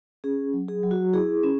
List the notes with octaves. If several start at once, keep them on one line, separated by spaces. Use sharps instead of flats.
C#4 G#4
F#3
G#4
F#3
F#4
E4 G#4
C#4